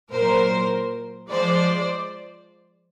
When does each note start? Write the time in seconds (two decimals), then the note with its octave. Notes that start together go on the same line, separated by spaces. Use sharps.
0.11 A#2 F#3 A#4 C5
1.29 F3 G#3 C5 D5